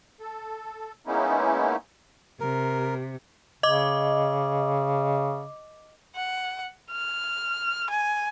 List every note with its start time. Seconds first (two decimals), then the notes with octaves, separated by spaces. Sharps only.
0.20 A4
1.07 G#3 A#3 B3 C#4 D#4 E4
2.40 C3 A#4
3.63 C#3 D#5 D6
6.16 F#5
6.91 F6
7.90 G#5